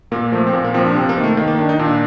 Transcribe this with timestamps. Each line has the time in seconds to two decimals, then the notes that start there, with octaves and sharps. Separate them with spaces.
0.12 A#2 A#3
0.32 F3 A3
0.47 C4
0.53 A#2 A#3
0.64 A#3
0.74 F3 C4
0.85 D4
0.95 C3 C4
1.09 A#3
1.17 D#3
1.24 A3
1.37 D#3 A#3
1.48 A#3
1.58 D#3 D4
1.69 D#4
1.79 A#2 D4